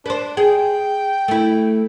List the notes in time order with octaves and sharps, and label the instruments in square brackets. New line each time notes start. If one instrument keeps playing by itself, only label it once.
[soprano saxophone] D4 [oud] B4 C5
[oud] G#4 [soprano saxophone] G5
[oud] A3 E4